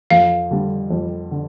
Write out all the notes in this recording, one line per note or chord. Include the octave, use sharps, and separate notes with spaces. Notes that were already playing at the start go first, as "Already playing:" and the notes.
F2 F5
D3 G3
F2
D3